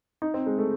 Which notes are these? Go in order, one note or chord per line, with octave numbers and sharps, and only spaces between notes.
D#4
C4
G#3
A3